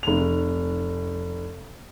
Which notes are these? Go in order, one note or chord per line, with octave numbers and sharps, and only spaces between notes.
F1 F7